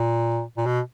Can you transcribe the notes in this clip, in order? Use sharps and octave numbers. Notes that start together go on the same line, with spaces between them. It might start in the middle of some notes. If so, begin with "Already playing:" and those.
Already playing: A#2
A#2
B2